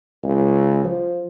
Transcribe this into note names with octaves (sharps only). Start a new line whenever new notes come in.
C#2
F3